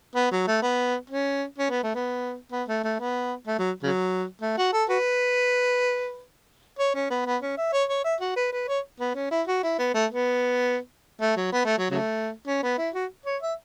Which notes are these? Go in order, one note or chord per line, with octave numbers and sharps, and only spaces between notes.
B3
F#3
A3
B3
C#4
C#4
B3
A3
B3
B3
A3
A3
B3
A3
F#3
C#3 F#3
A3
F#4
A4
F#4 B4
C#5
C#4
B3
B3
C#4
E5
C#5
C#5
E5
F#4
B4
B4
C#5
B3
C#4
E4
F#4
E4
B3
A3
B3
A3
F#3
B3
A3
F#3
C#3 F#3 A3
C#4
B3
E4
F#4
C#5
E5